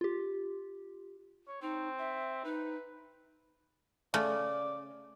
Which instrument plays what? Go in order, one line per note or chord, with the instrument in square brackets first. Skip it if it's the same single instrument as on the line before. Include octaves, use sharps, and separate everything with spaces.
[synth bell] F4 G4
[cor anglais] C#5
[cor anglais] C4 [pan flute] D#4
[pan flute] E5
[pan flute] D#4 [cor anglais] B4
[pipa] C#3 [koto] A3 [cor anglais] D5